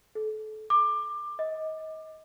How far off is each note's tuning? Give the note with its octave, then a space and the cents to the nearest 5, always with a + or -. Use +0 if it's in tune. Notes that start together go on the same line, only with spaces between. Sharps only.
A4 -30
D6 +20
D#5 +25